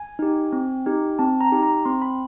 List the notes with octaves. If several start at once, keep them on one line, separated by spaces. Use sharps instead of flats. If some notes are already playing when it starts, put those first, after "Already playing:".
Already playing: G#5
D#4 G4
C4
D#4 G4
C4 A5
A#5
D#4 G4
A#5
C4 C6
B5